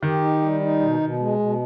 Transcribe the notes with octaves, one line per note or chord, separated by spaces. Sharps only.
D#3 G4
D#4
G3
D#4
B2
B2
G#3
B2